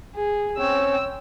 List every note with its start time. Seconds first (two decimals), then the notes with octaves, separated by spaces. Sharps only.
0.15 G#4
0.58 C4 C#4 C#5 G5 E6